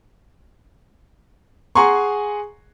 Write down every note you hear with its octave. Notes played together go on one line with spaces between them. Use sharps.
G#4 F#5 G#5 A#5 C6 C#6